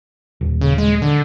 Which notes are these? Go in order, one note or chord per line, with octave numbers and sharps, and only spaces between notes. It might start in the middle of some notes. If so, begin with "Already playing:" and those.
D#1
C#3
G#3
D3